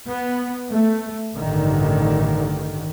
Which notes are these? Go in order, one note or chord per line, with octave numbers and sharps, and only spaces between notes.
B3
A3
A1 G2 D3 D#3